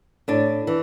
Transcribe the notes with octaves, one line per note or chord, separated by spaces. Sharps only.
A2 D4
E3